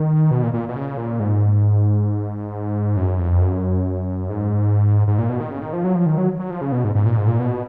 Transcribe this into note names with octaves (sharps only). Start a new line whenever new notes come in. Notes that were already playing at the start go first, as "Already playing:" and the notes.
Already playing: D#3
B2
A#2
A#2
B2
C#3
A#2
G#2
F#2
F2
F#2
G#2
G#2
A#2
B2
D#3
C#3
D#3
F3
F#3
F3
D#3
F#3
F#3
F3
C#3
B2
G#2
G#2
A#2
G#2
A#2
B2